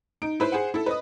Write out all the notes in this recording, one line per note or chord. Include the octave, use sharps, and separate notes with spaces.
D#4 D7
E4 B4 C5
G#4 C5 F#5
E4 A4
B4 D#5 D#6